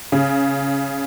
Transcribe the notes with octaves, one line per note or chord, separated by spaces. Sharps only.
C#3